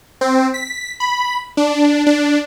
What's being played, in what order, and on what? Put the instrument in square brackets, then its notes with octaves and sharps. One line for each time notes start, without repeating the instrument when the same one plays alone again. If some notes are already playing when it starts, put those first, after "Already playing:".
[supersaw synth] C4
B6
B5
D4
D4